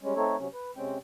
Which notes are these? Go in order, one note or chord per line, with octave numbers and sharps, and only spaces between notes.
G3 G#3 C#4
A3 C4 D#4 A4 C#5
C3 F#3 C#4
B4
C3 G#3 C4 C#4 G5